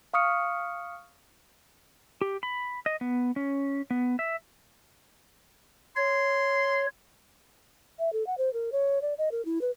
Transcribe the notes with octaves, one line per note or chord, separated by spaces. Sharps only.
F5 C#6 D#6 F6 C#7
G4
B5
D#5
B3
C#4
B3
E5
C#5 C6
E5
A4
F#5
C5
A#4
C#5
D5
D#5
A#4
E4
B4